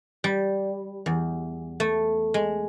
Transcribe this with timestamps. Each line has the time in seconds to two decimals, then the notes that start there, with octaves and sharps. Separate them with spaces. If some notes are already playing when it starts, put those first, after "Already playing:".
0.24 G3
1.06 E2
1.80 A3
2.34 G#3